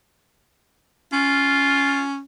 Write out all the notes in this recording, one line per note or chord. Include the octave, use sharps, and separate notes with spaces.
C#4 F4